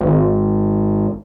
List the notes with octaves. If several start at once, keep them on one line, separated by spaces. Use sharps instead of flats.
G#1